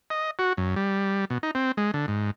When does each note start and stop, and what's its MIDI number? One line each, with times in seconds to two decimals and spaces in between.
0.10 0.31 75
0.39 0.53 66
0.57 0.75 42
0.76 1.25 55
1.30 1.38 47
1.43 1.51 63
1.55 1.72 60
1.77 1.91 56
1.94 2.06 50
2.08 2.31 44